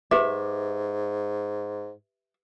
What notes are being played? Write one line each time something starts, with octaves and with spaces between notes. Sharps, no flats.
G#2 G4 B4 E5 D6